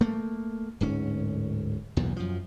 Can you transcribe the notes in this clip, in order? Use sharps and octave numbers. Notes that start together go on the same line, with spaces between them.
A3 A#3
D1 G#2 C#4
B1 E2 A#2
F#2 F3